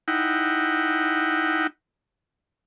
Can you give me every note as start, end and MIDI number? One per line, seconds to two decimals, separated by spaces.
0.08 1.67 63
0.08 1.67 64
0.08 1.67 78
0.08 1.67 79